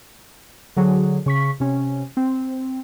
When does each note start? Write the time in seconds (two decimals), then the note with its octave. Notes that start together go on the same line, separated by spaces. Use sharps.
0.76 D3 F#3 G#4
1.26 C#3 C#6 B6
1.60 C3 C#4
2.17 C4